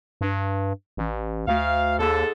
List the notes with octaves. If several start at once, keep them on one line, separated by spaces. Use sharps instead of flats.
G2
A1
D2 F5
D#2 G#2 G#4 A4